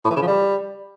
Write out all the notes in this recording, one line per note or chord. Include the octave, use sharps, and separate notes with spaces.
A2
E3
C#3
F3
G3